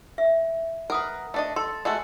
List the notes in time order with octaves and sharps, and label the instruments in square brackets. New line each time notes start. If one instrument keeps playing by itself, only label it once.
[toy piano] E5
[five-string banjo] A#4 B4 [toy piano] F#5 D#6
[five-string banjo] A3 D4 D#5
[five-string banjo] A4 [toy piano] C6
[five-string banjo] G#3 A3 F#4